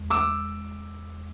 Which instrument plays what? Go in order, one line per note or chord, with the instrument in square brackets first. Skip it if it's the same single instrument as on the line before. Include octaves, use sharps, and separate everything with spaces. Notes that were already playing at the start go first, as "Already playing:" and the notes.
Already playing: [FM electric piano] E2 G#3
[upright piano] D6 E6